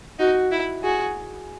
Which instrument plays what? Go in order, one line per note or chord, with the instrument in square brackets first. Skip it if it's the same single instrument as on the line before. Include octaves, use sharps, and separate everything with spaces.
[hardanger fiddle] D#4 [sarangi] F#4
[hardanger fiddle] E4
[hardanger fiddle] F#4 [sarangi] G#4